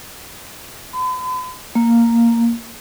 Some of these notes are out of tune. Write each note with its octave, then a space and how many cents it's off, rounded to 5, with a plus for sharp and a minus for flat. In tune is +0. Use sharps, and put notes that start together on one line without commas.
B5 +45
A#3 -5